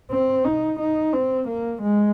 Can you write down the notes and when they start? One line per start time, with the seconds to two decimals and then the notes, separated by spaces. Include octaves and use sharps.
0.11 C4
0.45 D#4
0.79 D#4
1.13 C4
1.48 A#3
1.82 G#3